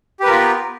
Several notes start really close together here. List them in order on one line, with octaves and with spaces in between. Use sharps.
G4 B4 A#4 F4 B3